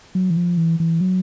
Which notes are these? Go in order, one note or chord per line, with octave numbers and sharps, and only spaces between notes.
F#3
E3
F3
E3
E3
F#3